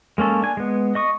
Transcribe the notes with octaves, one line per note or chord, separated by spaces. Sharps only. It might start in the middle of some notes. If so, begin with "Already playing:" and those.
G#3 A#3 C#4 A4
D4 G#5
G#3 B3
D#5 C#6 D#6